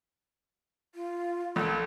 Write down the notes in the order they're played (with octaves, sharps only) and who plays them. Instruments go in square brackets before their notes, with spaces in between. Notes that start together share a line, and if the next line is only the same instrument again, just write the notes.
[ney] F4
[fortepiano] A#1 [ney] A4